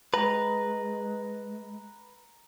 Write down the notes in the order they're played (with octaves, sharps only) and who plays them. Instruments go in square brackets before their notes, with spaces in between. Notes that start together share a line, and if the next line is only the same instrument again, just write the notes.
[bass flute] G#3 [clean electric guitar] B4 [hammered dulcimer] A#5